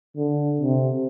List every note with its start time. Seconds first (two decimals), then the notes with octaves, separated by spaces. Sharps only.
0.17 D3
0.61 C3